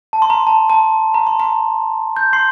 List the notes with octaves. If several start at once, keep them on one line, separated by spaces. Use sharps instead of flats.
A5
C6
A#5
A5
A5
A#5
C6
A#5
G6
C6 C7